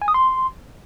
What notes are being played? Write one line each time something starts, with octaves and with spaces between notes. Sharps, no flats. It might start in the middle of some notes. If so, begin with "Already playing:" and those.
G#5
D#6
C6